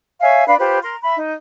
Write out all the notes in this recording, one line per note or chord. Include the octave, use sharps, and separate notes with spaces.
C#5 E5 F5 G#5
D4 B4 F5 B5
F4 G4 B4 C5
A#4 A#5 C6
E5 B5
D#4